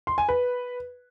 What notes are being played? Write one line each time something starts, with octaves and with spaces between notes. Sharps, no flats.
C6
G#5
B4